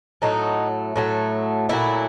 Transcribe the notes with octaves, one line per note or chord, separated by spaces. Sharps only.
A2 F#3 A3 D#4
A2 F#3 A3
A#2 F#3 A3 E4